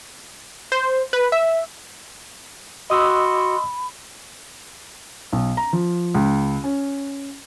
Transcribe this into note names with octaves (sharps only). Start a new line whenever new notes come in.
C5
B4
E5
F#4 D#5 B5 C6 D#6 E6
B1
A#5
F3
C#2
C#4